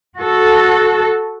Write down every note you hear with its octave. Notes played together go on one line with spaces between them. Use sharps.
F#4 A4